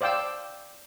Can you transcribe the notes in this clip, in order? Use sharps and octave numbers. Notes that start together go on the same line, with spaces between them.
C5 D5 F5 G5 E6